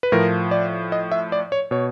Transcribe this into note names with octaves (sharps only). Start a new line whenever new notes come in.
B4
A2 F3 A#4
D5
D#5
E5
D5
C#5
B2 C#5